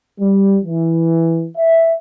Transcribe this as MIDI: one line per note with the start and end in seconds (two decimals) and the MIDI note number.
0.20 0.58 55
0.64 1.47 52
1.57 1.93 76